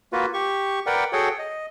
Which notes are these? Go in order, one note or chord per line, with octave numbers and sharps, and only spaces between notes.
A#3 F4 F#4 B4
G4 C#6
A#4 B4 D5 F#5 G5
F#4 G#4 A4 C#5 F#5 G5
D#5